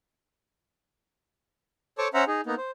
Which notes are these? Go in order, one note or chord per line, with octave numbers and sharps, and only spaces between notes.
A4 C5 C#5 A5 C#6 D6
C#4 C5 E5 F#5 A#5
D#4 G#4
A#3 B3 D#4
C5